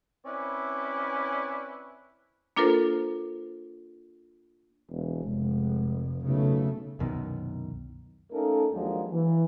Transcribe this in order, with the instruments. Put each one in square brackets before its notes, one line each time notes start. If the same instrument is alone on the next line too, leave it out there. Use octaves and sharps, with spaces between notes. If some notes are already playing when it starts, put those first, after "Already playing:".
[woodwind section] C4 C#4 E4 B4 D5
[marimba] A#3 D4 F4 A4 A#4 C5
[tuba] E1
[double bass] F1 [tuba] G#3
[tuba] B1 [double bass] C#3 A3
[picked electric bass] C2 F#2 B2 D#3
[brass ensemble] A3 A#3 C#4 D#4 A4 A#4
D#2 F3 F#3 G#3 A#3 D4
E3